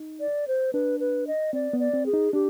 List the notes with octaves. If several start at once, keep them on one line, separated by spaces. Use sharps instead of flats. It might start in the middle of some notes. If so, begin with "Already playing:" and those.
Already playing: D#4
D5
C5
D4 B4
B4
D#5
C4 D5
B3
D5
C4
G#4
D#4
D4 G4